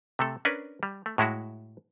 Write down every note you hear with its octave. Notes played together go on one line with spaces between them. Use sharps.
C3 A3 A4
C#4 D4 A#4 B4
G3
A3
A2 G#3 E4 F#4